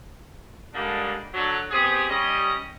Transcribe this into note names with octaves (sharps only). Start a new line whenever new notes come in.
D3 G3 G#3 A#3 D4 D#4
D3 F#3
B3 C4 G4 G#4
G3 C#4 D#5